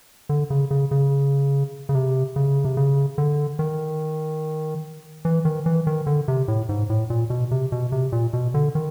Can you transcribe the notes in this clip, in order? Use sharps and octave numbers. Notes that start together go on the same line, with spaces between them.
D3
C#3
C#3
C#3
C#3
C3
C#3
C3
C#3
D3
D#3
E3
D#3
E3
D#3
D3
C3
A2
G#2
A2
A#2
B2
C3
B2
C3
A#2
B2
D3
D#3